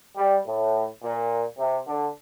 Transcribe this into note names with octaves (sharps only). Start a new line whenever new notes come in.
G3
A2
A#2
C3
D3